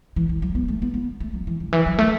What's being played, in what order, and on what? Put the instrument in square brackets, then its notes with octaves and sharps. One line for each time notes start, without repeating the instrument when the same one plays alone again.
[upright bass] E3
E3
F#3
B3
A3
B3
B3
A3
F#3
E3
D3
E3
F#3
A3